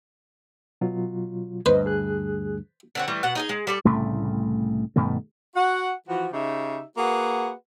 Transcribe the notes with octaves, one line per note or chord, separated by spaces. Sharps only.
B2 F#3 F4
D2 G2 B4 C5 D#5
G#4 F#6
D3 C4 F#4
E3 G3 A3
B2 F#5
D#4 G#4 D#5
G#3
G3 A4 D5
C2 A2 C#3 A3
G2 B2 D#3 A3
F#4 F#5
E3 F3 F#4
C#3 D#4 G4 E5
A#3 F#4 G#4 B4 F#5